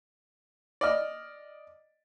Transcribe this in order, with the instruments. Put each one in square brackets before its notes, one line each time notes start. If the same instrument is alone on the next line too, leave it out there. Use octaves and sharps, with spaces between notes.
[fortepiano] D5 D#5 F6